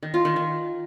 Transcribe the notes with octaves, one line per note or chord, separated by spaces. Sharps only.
D#3
F4
D#3
D#3